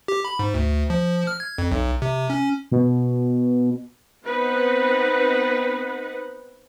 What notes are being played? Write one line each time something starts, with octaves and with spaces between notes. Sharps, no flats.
G4
B5
G#2
D2
F3
F6
G#6
F2
B1
C3
C#4
B2
B3 C4 D#4 B4 F#5